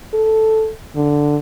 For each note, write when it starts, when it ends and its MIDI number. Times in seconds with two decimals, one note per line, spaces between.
0.14 0.71 69
0.96 1.37 50